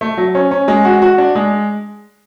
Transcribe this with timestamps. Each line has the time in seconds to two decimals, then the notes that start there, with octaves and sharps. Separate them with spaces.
0.01 A3
0.17 F#3
0.35 C#4
0.51 C#4
0.68 G#3
0.85 F#4
1.02 F#4
1.18 D4
1.35 G#3